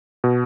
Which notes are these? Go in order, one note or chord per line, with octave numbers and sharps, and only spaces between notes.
B2